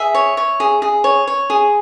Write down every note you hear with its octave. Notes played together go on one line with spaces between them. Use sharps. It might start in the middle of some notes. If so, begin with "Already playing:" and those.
Already playing: G#4 E5
C#5
C#5
G#4
G#4
C#5
C#5
G#4